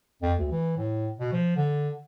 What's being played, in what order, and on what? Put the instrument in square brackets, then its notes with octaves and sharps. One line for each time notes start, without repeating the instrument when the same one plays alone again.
[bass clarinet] F2
D2
E3
A2
B2
F3
D3